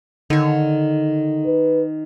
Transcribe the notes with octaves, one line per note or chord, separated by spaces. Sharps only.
D3 D#3 C#5
B4